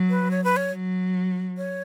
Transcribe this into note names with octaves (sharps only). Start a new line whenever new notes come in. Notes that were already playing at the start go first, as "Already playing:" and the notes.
Already playing: F#3
B4
C#5
B4
C#5
F#3
C#5